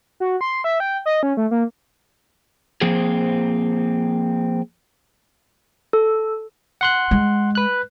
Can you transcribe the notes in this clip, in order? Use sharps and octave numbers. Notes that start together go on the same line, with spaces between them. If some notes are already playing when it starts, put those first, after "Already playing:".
F#4
C6
E5
G5
D#5
C#4
A3
A#3
F3 A#3 C4 G#4
A4
F#5 C6 F#6
G#3
B4 F#6